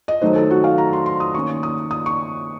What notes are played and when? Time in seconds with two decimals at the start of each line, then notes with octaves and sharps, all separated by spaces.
0.08 D#5
0.22 D#3 F#3 A3 D#4 C5
0.36 A4
0.51 F#4
0.64 F5
0.78 A#5
0.93 C6
1.06 C6
1.20 D#6
1.35 D#3 A#3 C#4 C#6
1.63 D#6
1.91 D#6
2.06 C#6